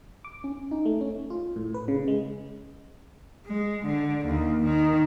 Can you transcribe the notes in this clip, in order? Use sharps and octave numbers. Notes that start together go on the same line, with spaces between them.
D6
C#4
D#4
A3
C#4
F4
A2
B4
C#3
G#3
G#3
D3
D#2
D#3